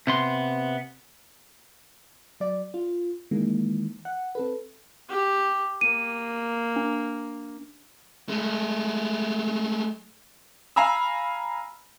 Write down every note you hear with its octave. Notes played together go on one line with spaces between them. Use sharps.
C3 B3 C6
F#3 D5
F4
D#3 E3 G#3 A#3
F#5
C4 A4 B4
G4
A#3 D#7
D4
G#3 A3
F5 G#5 A#5 B5 E6